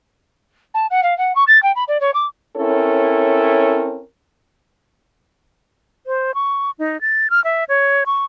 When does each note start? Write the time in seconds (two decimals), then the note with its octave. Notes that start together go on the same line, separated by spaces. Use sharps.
0.74 A5
0.91 F#5
1.03 F5
1.18 F#5
1.36 C#6
1.48 A6
1.63 G5
1.76 B5
1.88 D5
2.01 C#5
2.14 D6
2.57 C4 C#4 E4 A4 A#4 C#5
6.07 C5
6.35 C#6
6.79 D#4
7.01 A6
7.30 F6
7.44 E5
7.69 C#5
8.06 C#6